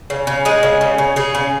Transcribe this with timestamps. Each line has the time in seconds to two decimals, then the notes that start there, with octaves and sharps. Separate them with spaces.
0.10 C#3
0.27 C#3
0.45 G#3 G#4
0.63 C#3
0.81 C#3
0.98 C#3
1.16 C#3 G#4
1.35 C#3